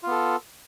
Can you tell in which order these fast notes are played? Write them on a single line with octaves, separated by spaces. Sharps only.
F4 B3 A4